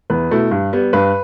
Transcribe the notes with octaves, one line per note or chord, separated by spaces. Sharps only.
E2 B4
B2 A3 E4
G2
G3 B3
G2 B4